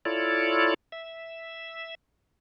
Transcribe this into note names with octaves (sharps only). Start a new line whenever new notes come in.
E4 F4 A4 C#5 D5
E5